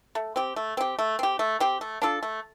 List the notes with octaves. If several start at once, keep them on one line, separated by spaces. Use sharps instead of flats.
A3
C4 G4
A3
C4 G4
A3
C4 G4
A3
C4 G4
A3
D4 F4 A4
A3